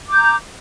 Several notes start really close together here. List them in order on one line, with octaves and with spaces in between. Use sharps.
D6 G6 A#5